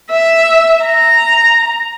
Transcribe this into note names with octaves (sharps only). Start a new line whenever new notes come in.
E5
A#5